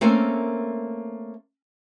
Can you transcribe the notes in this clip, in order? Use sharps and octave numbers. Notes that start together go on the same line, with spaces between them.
A3 A#3 C4 C#4 A#4 G#5